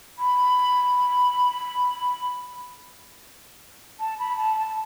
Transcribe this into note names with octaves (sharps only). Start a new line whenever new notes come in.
B5
A5
B5
A5
A5